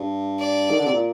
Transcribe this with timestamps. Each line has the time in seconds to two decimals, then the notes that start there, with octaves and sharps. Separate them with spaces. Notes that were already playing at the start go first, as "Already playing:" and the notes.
Already playing: G2
0.40 D5
0.70 D#3
0.78 D3
0.86 C3
0.93 A#2